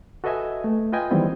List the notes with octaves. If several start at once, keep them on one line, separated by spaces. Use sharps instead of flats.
F#4 A4 B4 D#5 E5 G#5
A3
F4 B4 D#5 G5 G#5
D#3 E3 F#3 G3 B3 C4